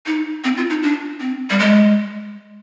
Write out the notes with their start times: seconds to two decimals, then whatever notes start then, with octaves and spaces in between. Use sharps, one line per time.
0.06 D#4
0.44 C4
0.57 F4
0.70 D#4
0.83 D4
1.20 C4
1.50 G3
1.59 G#3